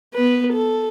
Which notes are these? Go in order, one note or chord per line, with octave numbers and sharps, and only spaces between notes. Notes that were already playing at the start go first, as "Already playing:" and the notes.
B3 B4
A4